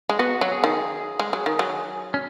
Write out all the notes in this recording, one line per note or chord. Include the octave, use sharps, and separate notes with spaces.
G#3
B3 F#4
F#3
G#4
D#3
G#3
F#3
D#3
F#3
C#4